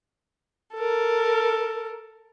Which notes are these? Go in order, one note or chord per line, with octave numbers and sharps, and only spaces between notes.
A4 A#4